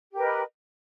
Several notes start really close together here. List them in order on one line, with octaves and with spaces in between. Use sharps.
G4 A#4 B4 D#5